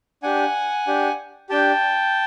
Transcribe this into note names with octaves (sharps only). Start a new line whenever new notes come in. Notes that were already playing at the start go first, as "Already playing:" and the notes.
D4 G4 F#5 G#5
D4 G4
D4 G4 G5 A5